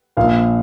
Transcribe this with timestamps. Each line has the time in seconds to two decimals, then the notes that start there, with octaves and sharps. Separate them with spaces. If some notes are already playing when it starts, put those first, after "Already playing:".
0.17 A#1 A#2 F3 F5